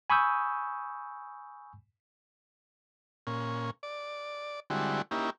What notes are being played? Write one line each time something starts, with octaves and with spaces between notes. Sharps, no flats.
G#5 B5 C#6 D#6 E6 G6
A#2 C#4
D5
D3 G3 G#3 C4 E4 F#4
A#3 C#4 D#4 E4 G4